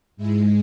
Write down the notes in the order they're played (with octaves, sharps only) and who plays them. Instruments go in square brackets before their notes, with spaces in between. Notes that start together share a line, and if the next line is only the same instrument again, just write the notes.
[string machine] G#2 G#3 E4